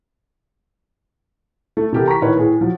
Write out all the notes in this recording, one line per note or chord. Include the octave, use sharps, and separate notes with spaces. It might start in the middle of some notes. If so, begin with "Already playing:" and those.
A3
C3 E3 E4 G4 A4 A#4
A#5 C#6 B6
A2 D#3 A#4 B4 C#5
A2 G#4
F3 F#3